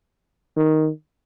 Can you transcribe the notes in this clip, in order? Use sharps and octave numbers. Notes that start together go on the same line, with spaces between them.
D#3